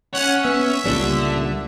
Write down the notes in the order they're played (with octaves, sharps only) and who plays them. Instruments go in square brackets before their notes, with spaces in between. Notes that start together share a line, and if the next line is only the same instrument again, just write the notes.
[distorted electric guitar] C#4 C#5 [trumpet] F#5
[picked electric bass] B3 [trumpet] E5
[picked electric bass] C#2 A#2 G3 [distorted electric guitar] D3